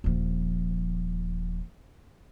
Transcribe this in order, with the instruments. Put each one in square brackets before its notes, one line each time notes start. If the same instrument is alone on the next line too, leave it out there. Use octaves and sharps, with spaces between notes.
[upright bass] D#1 F3